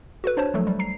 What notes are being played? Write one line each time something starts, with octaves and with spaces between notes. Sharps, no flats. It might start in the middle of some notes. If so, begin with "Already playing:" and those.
F#4 A4 B4
D4 C5 C#5 A5
F3 F#3 A3 A4
G3
A#5 C7